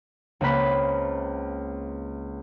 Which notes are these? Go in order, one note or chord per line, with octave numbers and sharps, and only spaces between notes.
C#2 A#3 C4 B4 B5 B6